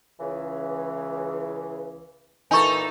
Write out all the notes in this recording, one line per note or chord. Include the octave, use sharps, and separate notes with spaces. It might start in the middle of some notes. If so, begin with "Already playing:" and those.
C#2 C#3 E3
A#2 E3 D#4 A4 G#5 C#6